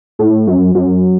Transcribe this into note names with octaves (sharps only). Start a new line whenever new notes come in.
A2
F#2
F#2